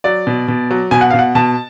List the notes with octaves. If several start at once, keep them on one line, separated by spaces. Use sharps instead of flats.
F#3 D5
B2
B2
F#3
B2 G#5
F#5
B2 F5
F#5
B2 A5